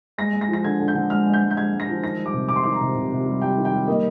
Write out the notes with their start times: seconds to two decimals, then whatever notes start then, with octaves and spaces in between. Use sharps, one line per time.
0.18 G#3 A#6
0.33 G#3
0.41 A#6
0.48 F3
0.53 A#6
0.64 D3 G#6
0.80 D3
0.88 G6
0.94 D3
1.10 G#3 F6
1.26 G#3
1.33 G6
1.42 G#3
1.51 G6
1.56 G#3 G#6
1.72 G#3
1.80 A#6
1.88 F3
2.02 D#3 A#6
2.19 G3
2.26 D6
2.33 C3
2.49 C3 D6
2.56 C6
2.64 D#3 D6
2.72 A#5
2.80 C3
2.95 C3
3.11 C3
3.26 G3
3.42 G3 G5
3.57 D#3
3.65 G5
3.73 G3
3.88 A#3 D#5